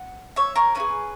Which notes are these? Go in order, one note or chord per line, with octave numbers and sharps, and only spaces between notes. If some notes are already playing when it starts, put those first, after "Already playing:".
Already playing: F#5
C#5 E5
A#4 C#5
C#4 E4 B4
G#4